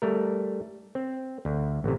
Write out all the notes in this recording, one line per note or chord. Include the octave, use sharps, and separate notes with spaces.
G3 A3 A#4
C4
D2
A1 C3